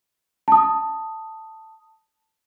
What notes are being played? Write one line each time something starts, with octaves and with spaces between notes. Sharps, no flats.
A5 D#6